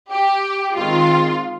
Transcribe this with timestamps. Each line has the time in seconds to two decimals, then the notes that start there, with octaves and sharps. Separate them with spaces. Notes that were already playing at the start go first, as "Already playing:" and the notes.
0.10 G4
0.75 D#3 G#3 C4 F4